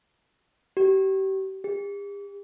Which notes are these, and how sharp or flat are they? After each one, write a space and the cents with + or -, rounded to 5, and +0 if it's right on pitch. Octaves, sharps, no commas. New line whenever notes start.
G4 -30
G4 +45